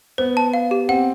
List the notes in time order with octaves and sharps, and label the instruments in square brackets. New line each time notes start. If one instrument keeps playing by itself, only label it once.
[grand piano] B3 [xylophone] C5
[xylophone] A5
F5
G4
[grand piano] C4 [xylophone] F#5